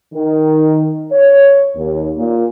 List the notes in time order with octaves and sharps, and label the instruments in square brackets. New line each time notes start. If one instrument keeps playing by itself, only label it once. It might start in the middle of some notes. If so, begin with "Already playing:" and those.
[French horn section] D#3
C#5
D#2
A#2